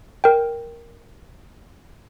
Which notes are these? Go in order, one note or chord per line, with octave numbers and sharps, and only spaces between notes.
A#4 G5